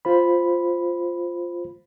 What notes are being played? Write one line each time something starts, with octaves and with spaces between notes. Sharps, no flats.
F4 C5 B5